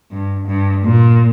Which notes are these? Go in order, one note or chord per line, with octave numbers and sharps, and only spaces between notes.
G2
G2
A#2